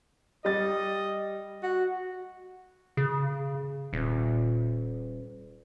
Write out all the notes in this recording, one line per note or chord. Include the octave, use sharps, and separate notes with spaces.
G3 D#5 A6
F#4
C#3
D#1